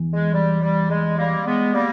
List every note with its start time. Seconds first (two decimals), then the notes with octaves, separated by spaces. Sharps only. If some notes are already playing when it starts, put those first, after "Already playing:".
Already playing: E2
0.13 G#3
0.34 G3
0.62 G3
0.90 G#3
1.18 G3 A#3
1.46 G#3 B3
1.73 G3 A#3